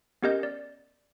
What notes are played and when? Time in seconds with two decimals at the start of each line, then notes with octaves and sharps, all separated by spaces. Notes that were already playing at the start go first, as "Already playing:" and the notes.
0.22 B3 C#4 G4 A#4 D#5 G6
0.43 D5